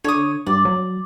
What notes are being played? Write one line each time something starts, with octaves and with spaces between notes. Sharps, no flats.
D3 C#5 D#6
G2 D5
F#3